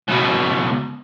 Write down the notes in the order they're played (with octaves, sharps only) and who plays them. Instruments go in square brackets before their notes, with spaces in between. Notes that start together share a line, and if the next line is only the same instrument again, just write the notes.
[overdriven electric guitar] C#2 B2